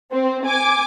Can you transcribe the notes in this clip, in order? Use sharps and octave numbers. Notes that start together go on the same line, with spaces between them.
C4
G#5 D6